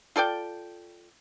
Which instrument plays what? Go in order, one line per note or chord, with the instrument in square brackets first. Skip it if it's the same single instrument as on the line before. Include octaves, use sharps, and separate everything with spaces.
[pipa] F4 A4 D5 G5